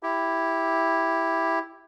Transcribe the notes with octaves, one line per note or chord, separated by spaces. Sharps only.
E4 G4